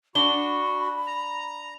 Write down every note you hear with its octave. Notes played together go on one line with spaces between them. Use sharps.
D4 F#4 B5 G7
A#5